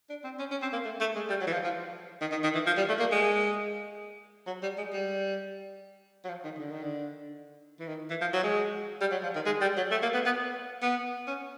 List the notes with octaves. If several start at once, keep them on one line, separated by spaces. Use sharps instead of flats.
D4
C4
C#4
C#4
C4
A#3
A3
A3
G#3
G3
F#3
E3
F3
F3
D#3
D#3
D#3
E3
F3
G3
A3
A#3
G#3
F#3
G3
G#3
G3
F#3
F3
D#3
D3
D#3
D3
E3
D#3
E3
F3
F#3
G#3
G3
F#3
F3
D#3
G#3
G3
F#3
A3
A#3
B3
B3
B3
C#4